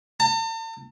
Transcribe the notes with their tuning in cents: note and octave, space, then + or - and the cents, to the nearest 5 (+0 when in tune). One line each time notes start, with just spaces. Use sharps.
A5 +45